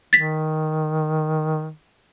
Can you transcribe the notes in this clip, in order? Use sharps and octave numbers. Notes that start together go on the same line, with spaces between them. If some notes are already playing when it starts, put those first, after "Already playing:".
D#3 A6 B6